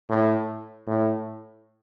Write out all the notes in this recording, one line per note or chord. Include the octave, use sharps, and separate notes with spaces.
A2
A2